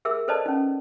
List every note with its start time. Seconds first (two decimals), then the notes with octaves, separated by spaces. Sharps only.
0.05 G#4 A#4 E5 E6
0.28 A4 B4 C5 D5 D#5 A5
0.46 C#4 D#4